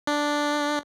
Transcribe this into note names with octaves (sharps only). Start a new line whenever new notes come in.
D4